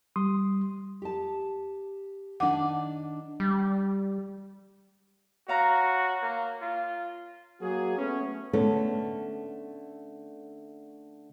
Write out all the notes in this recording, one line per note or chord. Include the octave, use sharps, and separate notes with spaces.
G3 C6 D#6
G4 A5
D#3 D4 F#5 D6
G3
F#4 C#5 F5 A#5
A#3
F4
F#3 A#3 F#4 G#4
A3 B3 C#4
D3 A3 B3 C#4 A4